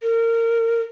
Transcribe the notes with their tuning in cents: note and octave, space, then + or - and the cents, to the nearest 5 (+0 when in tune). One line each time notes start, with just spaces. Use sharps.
A#4 -25